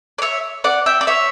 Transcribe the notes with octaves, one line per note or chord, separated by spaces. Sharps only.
D5
C#5 E5
D5 F#5
E5 G5
D5
C#5 E5